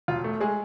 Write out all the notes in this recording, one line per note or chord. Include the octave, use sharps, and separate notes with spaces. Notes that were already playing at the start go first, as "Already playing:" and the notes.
E1 F4
A3
G#3 G#4